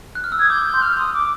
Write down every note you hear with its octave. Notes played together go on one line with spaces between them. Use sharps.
F#6
F6
E6
D#6 G#6
D6 G6
G6
C6
F6
C6 D#6
D6